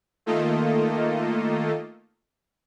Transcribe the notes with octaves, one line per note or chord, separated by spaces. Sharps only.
D#3 A3 A#3 F4 A4 D#5